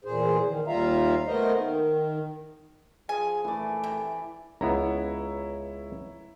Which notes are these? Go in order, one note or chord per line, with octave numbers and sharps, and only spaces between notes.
E2 A#2 G#4 C5
D#3
D#2 G3 F4 E5 F5 A#5
A3 B3 A#4 C5 D#5
D#3
F3 G#4 G#5
A#1 E3 A3 D5
C3
C#2 B3 E4 C#5 A#5